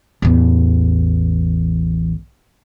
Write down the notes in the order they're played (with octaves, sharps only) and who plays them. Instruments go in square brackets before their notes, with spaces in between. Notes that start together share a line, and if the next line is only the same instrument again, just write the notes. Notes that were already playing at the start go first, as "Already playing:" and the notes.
[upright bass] A1 E2